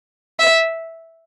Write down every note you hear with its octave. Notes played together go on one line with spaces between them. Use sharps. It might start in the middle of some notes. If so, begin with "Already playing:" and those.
E5